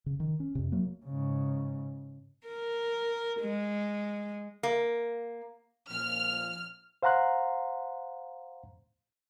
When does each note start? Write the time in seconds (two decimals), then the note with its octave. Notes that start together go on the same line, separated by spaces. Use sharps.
0.06 C#3
0.20 D#3
0.40 C#4
0.55 F2 C3
0.72 F#3 A#3
1.06 G#2 C#3
2.47 A#4
3.40 G#3
4.63 A#3
5.90 A#2 F3 F6
7.03 C5 F5 F#5 A#5 C6 F#6